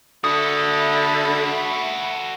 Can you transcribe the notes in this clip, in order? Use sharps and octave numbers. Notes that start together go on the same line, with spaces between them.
D3 F#4 A4 E5 A5 B5 D#6